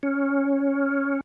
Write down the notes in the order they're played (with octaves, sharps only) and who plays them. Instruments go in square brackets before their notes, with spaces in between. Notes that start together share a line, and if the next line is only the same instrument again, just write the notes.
[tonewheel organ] C#4